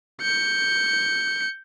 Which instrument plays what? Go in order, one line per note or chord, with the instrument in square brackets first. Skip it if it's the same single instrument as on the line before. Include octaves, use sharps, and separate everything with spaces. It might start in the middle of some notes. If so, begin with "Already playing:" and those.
[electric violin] G6 C#7